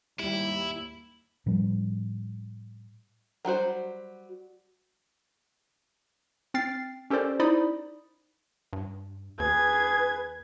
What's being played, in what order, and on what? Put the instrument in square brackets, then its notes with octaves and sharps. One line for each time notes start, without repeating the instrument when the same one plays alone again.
[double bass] D#2 G#2 [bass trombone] G3 [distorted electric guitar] E4
[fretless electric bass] A2 F3 G3 C#4
[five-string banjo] F#3 G3 F#4 C5
[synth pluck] C4 G5 F6 A6 C7
C#4 G4 A4 A#4 C5 D5
D#4 E4 C5 D5 B5 D#6
[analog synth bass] G2
[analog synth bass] D#2 [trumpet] G#4 [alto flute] B4 [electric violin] G#6